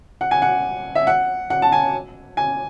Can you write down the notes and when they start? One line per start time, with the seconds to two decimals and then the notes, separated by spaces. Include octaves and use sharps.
0.21 F#5
0.31 G#5
0.42 F#5
0.95 E5
1.07 F#5
1.50 F#5
1.62 A5
1.72 G#5
2.37 G#5